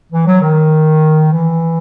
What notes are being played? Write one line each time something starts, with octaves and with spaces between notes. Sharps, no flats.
E3
F#3
D#3
E3